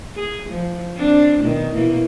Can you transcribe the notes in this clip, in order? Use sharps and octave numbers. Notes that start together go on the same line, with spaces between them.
G#4
F3
C4 D4
B2 D#3
B2 E3 A#3